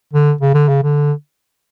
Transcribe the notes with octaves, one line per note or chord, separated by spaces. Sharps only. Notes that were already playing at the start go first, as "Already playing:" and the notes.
D3
C#3
D3
C#3
D3